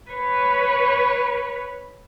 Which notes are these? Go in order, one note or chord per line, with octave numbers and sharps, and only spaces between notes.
B4 C#5